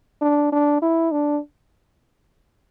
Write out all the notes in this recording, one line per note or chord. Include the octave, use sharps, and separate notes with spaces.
D4
D4
E4
D4